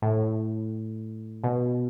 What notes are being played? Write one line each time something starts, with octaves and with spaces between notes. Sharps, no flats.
A2
B2